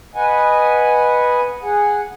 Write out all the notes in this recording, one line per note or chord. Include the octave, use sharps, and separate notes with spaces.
B4 D#5 F#5 G#5
G#4 F#5